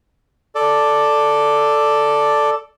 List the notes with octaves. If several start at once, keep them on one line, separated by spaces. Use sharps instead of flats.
A4 D5